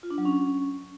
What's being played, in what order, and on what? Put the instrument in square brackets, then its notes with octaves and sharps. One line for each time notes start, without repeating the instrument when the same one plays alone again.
[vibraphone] F4
D4
F#3
C#4